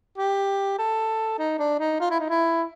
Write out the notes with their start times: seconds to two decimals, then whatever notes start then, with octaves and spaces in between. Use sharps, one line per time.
0.18 G4
0.78 A4
1.39 D#4
1.59 D4
1.79 D#4
2.00 F4
2.11 E4
2.20 D#4
2.30 E4